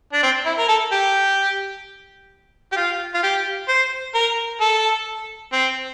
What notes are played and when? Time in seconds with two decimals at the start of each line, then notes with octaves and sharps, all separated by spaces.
0.13 D4
0.23 C4
0.46 E4
0.58 A#4
0.68 A4
0.92 G4
2.72 G4
2.76 F4
3.14 F4
3.23 G4
3.68 C5
4.14 A#4
4.60 A4
5.52 C4